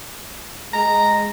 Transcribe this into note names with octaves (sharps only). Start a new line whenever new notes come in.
G#3 A#5